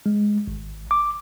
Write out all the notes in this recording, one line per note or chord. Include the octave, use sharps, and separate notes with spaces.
G#3
G#1
D6